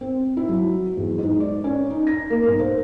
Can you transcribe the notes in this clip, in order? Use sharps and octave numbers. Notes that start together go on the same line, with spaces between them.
C4
E4
F#3
E2
G#2
D5
C#4
D#4
A#6
A#3
B1
C5